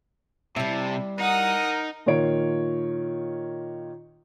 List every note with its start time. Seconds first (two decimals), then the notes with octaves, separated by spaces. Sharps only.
0.56 C3 G3 E4 A5
1.19 D#4 A#4 F#5 D#6
2.06 A#2 D#3 F4 C#5 D7